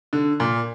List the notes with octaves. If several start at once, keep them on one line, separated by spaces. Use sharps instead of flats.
D3
A#2